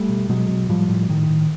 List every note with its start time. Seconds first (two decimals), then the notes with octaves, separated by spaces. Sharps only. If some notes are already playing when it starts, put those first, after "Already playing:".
Already playing: G3 A3
0.09 B2
0.29 B2 F#3 G#3
0.49 B2
0.69 A2 F3 G3
0.89 A2
1.09 A2 D#3
1.29 A2